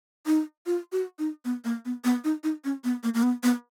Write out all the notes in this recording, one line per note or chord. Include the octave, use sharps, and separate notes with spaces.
D#4
F4
F#4
D#4
B3
A#3
B3
B3
D#4
D#4
C#4
B3
A#3
A#3
B3
B3